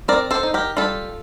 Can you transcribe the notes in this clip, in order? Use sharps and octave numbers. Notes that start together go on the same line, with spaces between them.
C4 A#4 D5
A4 C5
D#4
G4 A#4
G3 F4 A4